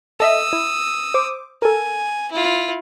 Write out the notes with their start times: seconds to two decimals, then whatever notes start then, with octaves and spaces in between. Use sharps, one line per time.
0.20 A4 D#5 E5 D#6 E6
0.53 E4
1.14 C5 D6
1.62 A4 A#4 G#5
2.32 E4 F4